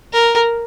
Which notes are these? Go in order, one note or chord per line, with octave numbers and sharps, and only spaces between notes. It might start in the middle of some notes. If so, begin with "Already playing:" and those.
A#4